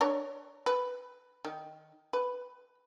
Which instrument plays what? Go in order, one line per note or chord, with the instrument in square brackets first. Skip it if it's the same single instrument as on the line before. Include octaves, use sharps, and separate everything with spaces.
[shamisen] D4 A#4 C#5
B4
D#3
B4